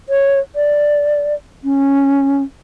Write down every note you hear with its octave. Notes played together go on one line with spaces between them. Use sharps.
C#5
D5
C#4